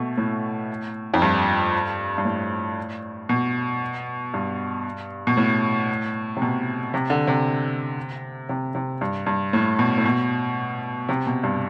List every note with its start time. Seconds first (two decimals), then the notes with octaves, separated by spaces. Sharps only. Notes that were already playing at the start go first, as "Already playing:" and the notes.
Already playing: B2 A3
0.18 A2
1.14 F2
1.22 G2
2.18 G2
2.25 A2
3.29 B2
4.34 G2
5.27 B2
5.37 A2
6.37 C3
6.42 B2
6.94 C3
7.10 D3
7.27 C3
8.49 C3
8.75 C3
9.01 G2
9.26 G2
9.53 A2
9.79 B2
9.98 A2
10.05 B2
11.09 C3
11.26 B2
11.43 G2